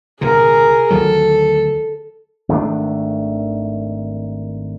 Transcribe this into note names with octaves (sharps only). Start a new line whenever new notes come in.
C2 A#2 D3 G#4 A#4
D2 D#3 F#3 A4
G#1 D#3 A3 D4